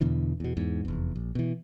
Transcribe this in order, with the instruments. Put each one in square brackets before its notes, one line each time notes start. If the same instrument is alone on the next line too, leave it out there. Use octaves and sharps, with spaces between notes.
[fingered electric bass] E2 B2 D3 E3
E2 B2
E2 G#2
F1 E2
A#1
B2 E3